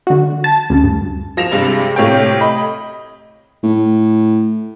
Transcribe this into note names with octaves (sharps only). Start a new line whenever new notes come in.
D3 F#4
A5
D2 C#3
G2
F3 A#6 E7 F7
G2 C3 G3 G#3
A2 C3 C#5 F5 G5
D#5 B5
A2